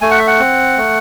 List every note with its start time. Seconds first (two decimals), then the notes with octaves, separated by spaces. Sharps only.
0.01 A3 G#5
0.11 F#5
0.18 E5
0.27 F#5
0.39 C4
0.77 A3